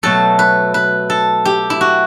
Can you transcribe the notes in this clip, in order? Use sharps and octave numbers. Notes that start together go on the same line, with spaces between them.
B2 F#3 A3 A4
B4
B4
A4
G4
E4
F#4